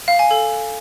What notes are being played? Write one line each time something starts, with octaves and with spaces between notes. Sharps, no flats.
F5
G#5
A4